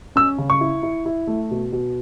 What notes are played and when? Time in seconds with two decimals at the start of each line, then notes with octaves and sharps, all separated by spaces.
0.16 C#4 E6
0.38 C#3
0.50 C#6
0.61 E4
0.83 E4
1.06 E4
1.27 A3
1.51 B2
1.72 B2